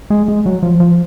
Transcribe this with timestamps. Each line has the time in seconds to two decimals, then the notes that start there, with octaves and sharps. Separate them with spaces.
0.10 G#3
0.28 G#3
0.46 F#3
0.63 F3
0.80 F3